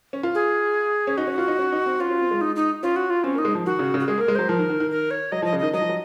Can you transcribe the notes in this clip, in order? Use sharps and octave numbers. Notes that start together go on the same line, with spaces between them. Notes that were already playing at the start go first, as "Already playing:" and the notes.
C#4
F4
G#4
C#4
D#4 F#4
C#4
F4
D#4
C#4
D#4
C4
C#4 F4
C#4
C4
G#3
D#4
D#4
C#4 F4
F#4
F4
C4 C#4
A#3
D#4
G#3
F3
D#3 F#4
C#3
C#3
F#4
G#3 G#4
A#3
A#4
G#3
F#3 C5
F3 A#4
D#3
D#3
D#3
A#4
C#5
F#3 D#5
F3
D#5
C#3
D#3 D#5
F#3 D#5
F3
F#3